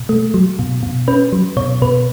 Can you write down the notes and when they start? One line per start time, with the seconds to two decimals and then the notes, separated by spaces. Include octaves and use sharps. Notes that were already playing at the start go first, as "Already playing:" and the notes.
Already playing: B2
0.09 A3
0.34 F#3
0.59 B2
0.83 B2
1.08 C#4 B4
1.33 F#3
1.57 B2 C#5
1.82 B2 B4